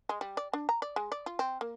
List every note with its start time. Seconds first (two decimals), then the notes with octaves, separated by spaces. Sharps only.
0.09 G#3
0.21 G3
0.37 D5
0.53 D4
0.69 A#5
0.82 D5
0.96 G#3
1.12 D5
1.26 F4
1.39 C4
1.61 A#3